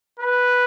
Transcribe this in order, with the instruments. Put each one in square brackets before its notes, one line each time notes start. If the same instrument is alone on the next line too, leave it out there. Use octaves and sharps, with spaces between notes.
[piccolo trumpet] B4